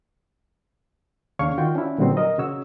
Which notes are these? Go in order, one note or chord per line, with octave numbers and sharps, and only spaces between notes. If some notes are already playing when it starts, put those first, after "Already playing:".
D#2 C#3 D4 C#5 F5 C#6
D#3 F4 F#4 G5
C#4 D4 E4
A#2 D3 F#3 G3 B3 C4
A#4 D#5
C#3 F#4 C#5 E6